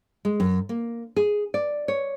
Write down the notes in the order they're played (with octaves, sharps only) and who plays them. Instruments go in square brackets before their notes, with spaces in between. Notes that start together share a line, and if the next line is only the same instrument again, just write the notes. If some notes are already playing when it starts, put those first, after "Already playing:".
[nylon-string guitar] G#3
F#2
A#3
G#4
D5
C#5